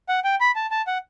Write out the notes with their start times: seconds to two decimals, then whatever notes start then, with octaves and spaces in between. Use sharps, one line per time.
0.09 F#5
0.24 G5
0.40 B5
0.56 A5
0.71 A5
0.87 F#5